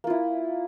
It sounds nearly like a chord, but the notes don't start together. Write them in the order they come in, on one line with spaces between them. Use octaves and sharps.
A#3 F4 E4